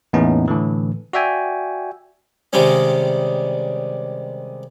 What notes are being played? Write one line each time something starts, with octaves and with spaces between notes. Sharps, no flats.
E2 A2 A#3 B3 C#4 D#4
A2 D3 E3
F#4 D5 E5 G5 G#5
C3 D#3 G3 G#3 C#4